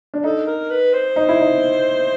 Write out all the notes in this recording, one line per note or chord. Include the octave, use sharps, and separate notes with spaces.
D4
D#4 A4
A#4
B4
C5
D#4
E4
D#4